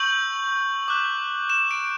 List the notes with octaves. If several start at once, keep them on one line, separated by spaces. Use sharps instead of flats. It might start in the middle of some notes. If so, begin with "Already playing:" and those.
Already playing: C#6 E6 G6 F#7
D6 F#6
E7
D7